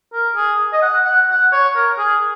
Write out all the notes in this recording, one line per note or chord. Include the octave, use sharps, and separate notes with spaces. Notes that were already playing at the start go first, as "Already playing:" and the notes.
A#4
G#4
D#5
F#5
F#5
F#5
C#5
A#4
G#4